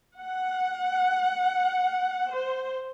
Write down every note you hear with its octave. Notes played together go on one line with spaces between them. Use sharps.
F#5
C5